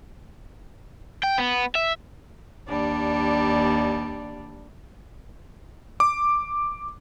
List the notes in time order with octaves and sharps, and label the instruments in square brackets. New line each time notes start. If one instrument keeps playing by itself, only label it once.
[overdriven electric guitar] G5
B3
E5
[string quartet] D#2 G3 D4
[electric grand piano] D6